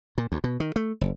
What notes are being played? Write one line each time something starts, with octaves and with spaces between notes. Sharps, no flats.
A#2
D2
B2
D#3
A3
F#1